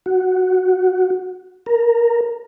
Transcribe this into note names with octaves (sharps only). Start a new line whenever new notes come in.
F#4
A#4